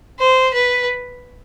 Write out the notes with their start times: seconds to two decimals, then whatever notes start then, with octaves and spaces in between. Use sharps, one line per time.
0.19 C5
0.54 B4